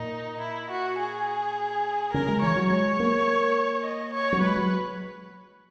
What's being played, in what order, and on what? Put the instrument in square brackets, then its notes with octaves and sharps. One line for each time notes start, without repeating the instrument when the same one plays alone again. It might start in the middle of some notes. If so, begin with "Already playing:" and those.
Already playing: [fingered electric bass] A#2 [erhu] D#4
[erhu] E4
F#4
G#4
[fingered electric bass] C#3 [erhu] A#4
[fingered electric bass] G#3
[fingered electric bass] E3 [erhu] C#5
[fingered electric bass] F#3
[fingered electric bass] G#3 [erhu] C#5
[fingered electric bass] A#3
[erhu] D#5
C#5
[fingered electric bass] F#3
[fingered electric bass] G#3 [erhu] B4
[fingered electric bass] F#3